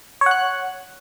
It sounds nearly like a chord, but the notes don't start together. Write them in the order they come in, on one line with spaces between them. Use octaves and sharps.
C#5 F#5 F#6